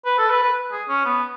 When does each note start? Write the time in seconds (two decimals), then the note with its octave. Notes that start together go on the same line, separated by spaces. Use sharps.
0.05 B4
0.18 A4
0.30 B4
0.42 B4
0.72 G#4
0.88 C#4
1.05 B3